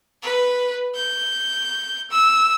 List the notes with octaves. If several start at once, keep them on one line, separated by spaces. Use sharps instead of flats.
B4
G6
E6